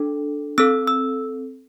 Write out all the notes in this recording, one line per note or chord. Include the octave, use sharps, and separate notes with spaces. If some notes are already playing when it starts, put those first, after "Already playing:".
Already playing: D4 A4
C4 A4 E6
E6